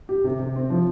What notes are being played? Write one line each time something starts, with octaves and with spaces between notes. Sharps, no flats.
G4
C3
C3
C4
F3